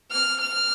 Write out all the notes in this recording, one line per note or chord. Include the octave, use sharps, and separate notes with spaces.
F6
F6